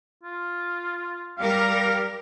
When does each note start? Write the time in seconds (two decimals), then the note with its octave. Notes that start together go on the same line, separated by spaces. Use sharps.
0.23 F4
1.38 G3 G4 A#4 F5